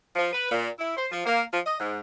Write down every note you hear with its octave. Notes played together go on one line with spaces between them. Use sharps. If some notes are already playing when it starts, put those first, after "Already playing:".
F3
B4
A#2
E4
C5
F3
A#3
F3
D#5
G#2